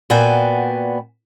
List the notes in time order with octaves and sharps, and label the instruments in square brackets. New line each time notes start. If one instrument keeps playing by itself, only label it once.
[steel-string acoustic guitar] A#2 B3 F#4 D5 G5 G#5